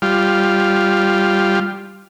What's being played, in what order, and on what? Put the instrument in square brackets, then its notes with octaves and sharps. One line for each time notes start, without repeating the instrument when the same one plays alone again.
[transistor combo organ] G3 F4